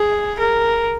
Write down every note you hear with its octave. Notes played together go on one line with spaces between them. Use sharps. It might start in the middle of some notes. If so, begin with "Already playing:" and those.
Already playing: G#4
A#4